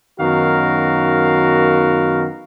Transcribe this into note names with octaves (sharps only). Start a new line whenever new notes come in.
F#2 D#3 B3 F#4 A#4 F5